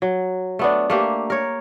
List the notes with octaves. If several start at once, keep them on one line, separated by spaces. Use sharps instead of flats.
F#3
A3 B3 D4
A3 A#3 G4
A#4 C#5